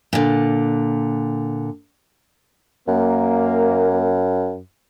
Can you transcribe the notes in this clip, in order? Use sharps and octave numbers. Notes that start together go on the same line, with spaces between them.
A#2 D3
F#2 A#3